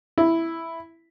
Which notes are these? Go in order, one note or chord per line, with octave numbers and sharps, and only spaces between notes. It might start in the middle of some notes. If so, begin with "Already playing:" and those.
E4